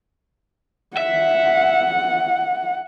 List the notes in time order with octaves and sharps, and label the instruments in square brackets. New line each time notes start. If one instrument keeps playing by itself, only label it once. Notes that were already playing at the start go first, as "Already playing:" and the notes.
[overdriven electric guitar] E5 [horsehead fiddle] F#5